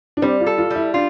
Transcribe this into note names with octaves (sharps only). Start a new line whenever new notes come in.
D4
G3 C4
F4
A4
F4
G3
E4
D4 F4